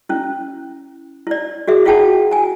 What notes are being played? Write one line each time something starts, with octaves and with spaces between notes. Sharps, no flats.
C#4 E4
E4 D5
F#4 G#4 E5
E4 F4 G#4 F#5 G5 A5
G#5 A#5